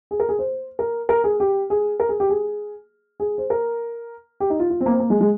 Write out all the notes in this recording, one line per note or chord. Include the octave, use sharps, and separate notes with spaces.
G#4
A#4
G#4
C5
A#4
A#4
G#4
G4
G#4
A#4
G#4
G4
G#4
G#4
C5
A#4
G4
D#4
F4
F4
C4
A#3
C4
A#3
G#3
G#3